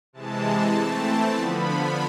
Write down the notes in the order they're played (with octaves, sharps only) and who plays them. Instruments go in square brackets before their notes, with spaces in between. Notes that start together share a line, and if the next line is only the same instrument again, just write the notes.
[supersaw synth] C3 E3 G#3 A5
E3 A3 C4
D3 F3 B3 B5
B5